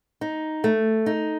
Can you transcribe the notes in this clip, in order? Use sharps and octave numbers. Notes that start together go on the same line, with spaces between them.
D#4
A3
D#4